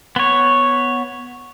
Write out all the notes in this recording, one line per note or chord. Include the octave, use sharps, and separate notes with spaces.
B3 C#5